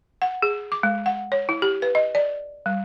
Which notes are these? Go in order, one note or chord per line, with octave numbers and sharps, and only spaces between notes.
F#5
G#4
D6
G#3
F#5
C#5
E4
G4
B4
D#5
D5
G3